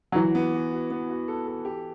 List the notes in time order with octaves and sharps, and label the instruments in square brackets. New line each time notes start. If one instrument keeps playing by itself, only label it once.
[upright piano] F#3
[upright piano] E3 [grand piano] F#4
[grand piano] B3
F#4
F#4
B3
F#4
A4
A4
G4